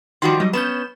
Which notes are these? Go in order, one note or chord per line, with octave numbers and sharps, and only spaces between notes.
D#3 F3 G3 F#4 C6
F#3 G3 D#5
B3 C#4 G6 E7